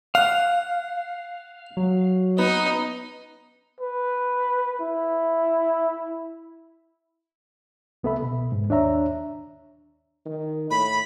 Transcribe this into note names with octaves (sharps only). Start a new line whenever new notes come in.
F5 F#5
F#3
B3 D#4
B4
E4
C2 B3 A4 E5 B5
B2
G#2
D#2 D4 C#5 E5 A#5
D#3
A2 B5